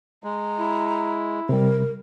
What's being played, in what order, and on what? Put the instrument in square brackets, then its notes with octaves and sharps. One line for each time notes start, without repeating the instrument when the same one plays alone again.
[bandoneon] G#3 [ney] A#5
[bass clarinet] E4
[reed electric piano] C3 G3 [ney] A#4